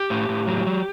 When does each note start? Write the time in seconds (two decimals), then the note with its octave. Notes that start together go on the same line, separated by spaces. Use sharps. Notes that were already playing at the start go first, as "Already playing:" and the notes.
Already playing: G4
0.10 A2
0.29 A2
0.47 F#3
0.66 F#3